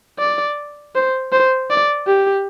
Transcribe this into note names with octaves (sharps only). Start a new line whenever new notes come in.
D5
C5
C5
D5
G4